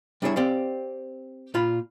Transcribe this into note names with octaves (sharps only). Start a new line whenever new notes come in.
G3 D4 E4 G#4 C#5 E5
C4 G4 D5 F5
A#2 F4 B5